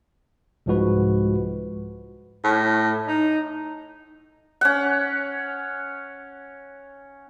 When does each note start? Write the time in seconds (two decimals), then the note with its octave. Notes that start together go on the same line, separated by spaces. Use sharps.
0.66 C2 G#2 F3 G#3 F#4 B4
2.44 A2
3.08 D#4
4.61 C#4 F#5